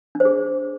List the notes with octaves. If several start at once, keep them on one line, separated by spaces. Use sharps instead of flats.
D4
C5
G#4